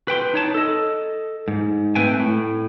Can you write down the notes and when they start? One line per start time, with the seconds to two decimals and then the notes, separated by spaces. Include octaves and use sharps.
0.08 B4 G5 C6
0.34 D#4 C#5 A5
0.54 A4 D#5
1.48 G#2
1.95 A3 C4 B4 G5 G#5
2.20 A2